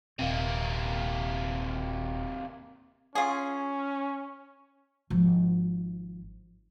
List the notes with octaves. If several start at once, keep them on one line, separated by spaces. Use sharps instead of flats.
D#1 C3 A#3 C4
C#4 F4 G#4
G#1 F3